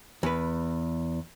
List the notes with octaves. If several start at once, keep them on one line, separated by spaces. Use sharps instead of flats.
E2 B4